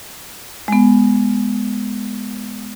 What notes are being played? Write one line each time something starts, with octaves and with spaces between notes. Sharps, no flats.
G#3 B3